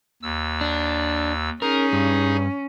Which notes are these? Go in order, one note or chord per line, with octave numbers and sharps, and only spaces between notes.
D#2 E6
D4
C#4 D#4 G#4 A#4
G2